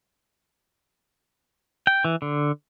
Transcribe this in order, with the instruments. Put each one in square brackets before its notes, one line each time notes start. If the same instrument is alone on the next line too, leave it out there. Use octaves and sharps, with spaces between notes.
[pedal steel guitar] G5
E3
D3